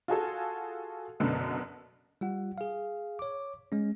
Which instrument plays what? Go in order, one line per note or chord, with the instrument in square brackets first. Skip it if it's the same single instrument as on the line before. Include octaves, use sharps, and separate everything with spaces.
[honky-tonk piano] F4 F#4 G#4 A4
F#1 F#2 B2 D3 B3
[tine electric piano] G3 F4 F#5
G#4 F5
C#5 D6
G#3 C#4